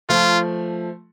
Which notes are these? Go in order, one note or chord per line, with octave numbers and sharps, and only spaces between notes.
F3 A3 F4